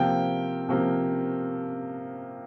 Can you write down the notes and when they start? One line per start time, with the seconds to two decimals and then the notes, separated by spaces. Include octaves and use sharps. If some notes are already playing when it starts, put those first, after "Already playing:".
Already playing: C3 F3 A#3 G5
0.69 C3 F3 A#3